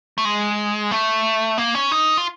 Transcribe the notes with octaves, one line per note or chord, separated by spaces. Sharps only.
A3
G#3
A3
A#3
C#4
D#4
F4